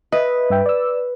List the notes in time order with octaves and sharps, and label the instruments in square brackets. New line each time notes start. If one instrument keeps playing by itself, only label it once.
[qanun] B4 [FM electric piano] D#5 E5
[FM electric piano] G2 E5 G5
D5 E6